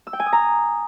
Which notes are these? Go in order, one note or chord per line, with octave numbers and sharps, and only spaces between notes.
E6
G5
G#5
D#6
A#5